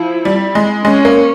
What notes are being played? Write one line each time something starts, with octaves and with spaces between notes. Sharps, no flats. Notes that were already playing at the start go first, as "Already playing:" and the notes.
Already playing: F3 E4
G3
G#3
G#3 C#4
A#3